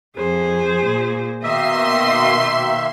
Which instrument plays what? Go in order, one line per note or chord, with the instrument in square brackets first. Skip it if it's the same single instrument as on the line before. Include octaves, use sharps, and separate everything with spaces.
[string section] F2 [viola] G#4 C5
[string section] A#2
[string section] B2 C6 [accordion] D#3 A#3 E5 [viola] D#5